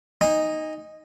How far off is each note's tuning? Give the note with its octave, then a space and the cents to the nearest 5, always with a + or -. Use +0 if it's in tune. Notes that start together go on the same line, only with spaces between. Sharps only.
D#4 +0 G#5 -30